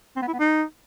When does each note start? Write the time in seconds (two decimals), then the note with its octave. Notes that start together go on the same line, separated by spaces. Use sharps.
0.16 C4
0.22 B3
0.28 E4
0.34 B3
0.39 D#4